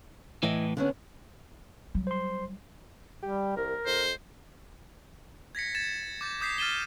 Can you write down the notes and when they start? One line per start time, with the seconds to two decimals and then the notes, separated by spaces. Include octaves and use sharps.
0.43 A2 E3 E4 D#5
0.77 D3 B3 C#4
1.95 F#3 G3
2.07 C5 C6
3.22 G3 G4
3.57 C2 A#4
3.86 F2 C5
5.55 G#6 A#6 B6 C#7
5.75 G#6 A6 E7
6.21 D6 G6 A6
6.41 D6 D#6 G6 B6 C7
6.58 F6 A6 D#7 E7 G7